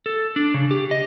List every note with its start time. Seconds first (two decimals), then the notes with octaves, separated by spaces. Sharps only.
0.06 A4
0.36 D4
0.54 C#3
0.71 G4
0.91 D#5